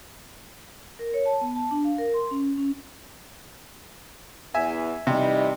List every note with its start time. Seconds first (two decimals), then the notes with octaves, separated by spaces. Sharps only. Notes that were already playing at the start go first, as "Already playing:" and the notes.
0.99 A#4
1.14 C#5
1.26 A5
1.41 B3
1.55 A5
1.71 D4
1.84 F5
1.98 A#4
2.14 C6
2.31 C#4
2.58 C#4
4.54 E2 E5 G#5
5.07 C3 E3 G3 D#4